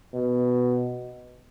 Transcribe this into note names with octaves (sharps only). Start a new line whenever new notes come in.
B2